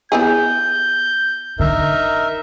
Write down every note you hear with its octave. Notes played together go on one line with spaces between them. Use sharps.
B3 E4 G#4 G6
D3 D#4 A#4 E5